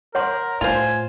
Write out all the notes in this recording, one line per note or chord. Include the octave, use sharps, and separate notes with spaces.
A#4 C#5 F#5 C6
A2 F4 C5 G#5